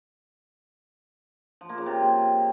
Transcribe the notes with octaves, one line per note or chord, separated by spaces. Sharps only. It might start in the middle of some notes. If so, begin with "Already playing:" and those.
F3
A#3
C#3
C3